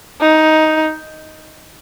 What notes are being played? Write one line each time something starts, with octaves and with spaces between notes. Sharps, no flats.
D#4